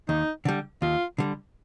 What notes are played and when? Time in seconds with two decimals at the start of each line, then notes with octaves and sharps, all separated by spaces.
0.09 D#2 D#4
0.45 D3 G3
0.82 D#2 F4
1.18 D3 G3